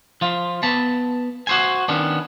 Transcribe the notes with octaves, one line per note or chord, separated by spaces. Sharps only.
F3 F4
B3 A5 B5
F#4 C5 G#5
D#3 B3 C#4 D4